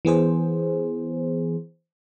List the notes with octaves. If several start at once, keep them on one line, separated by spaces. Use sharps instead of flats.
E3 B3 G#4 C5